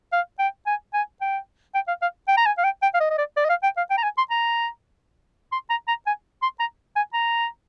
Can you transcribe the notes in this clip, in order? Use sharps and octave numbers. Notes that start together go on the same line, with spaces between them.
F5
G5
G#5
G#5
G5
G5
F5
F5
G5
A#5
G#5
F5
G5
G5
F5
D#5
D#5
D5
D5
D#5
F5
G5
F5
G5
A#5
G#5
C6
A#5
C6
A#5
A#5
G#5
C6
A#5
G#5
A#5